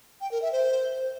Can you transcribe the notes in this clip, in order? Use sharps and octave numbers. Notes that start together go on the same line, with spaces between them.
G5
A#4
E5
C5